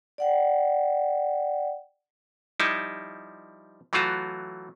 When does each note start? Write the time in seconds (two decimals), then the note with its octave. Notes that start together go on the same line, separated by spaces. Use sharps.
0.18 D5 F#5 G5
2.60 F3 G3 D#4 E4
3.93 E3 F#3 A3 F4 F#4